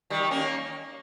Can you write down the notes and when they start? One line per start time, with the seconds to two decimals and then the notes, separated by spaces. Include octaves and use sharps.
0.10 D#3 G3
0.31 A#3 C#4